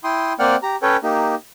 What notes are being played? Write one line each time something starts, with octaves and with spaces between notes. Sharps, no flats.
E4 G5 C6 D#6
A#3 C4 D5 F#5 G5 F6
G4 A#5
C#4 A4 B4 C#5 G5
A#3 D#4 G4